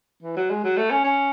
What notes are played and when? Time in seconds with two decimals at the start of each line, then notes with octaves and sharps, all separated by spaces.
0.23 E3
0.36 F#3
0.50 G#3
0.64 F#3
0.77 A3
0.91 C#4
1.04 C#4